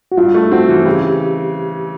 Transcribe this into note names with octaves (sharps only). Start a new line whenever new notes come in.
F#4
G2 F4
A3
C4 F#4
E3
C#3 G4